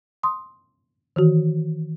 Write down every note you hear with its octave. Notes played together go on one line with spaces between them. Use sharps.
C6 D#6
D#3 E3 F#4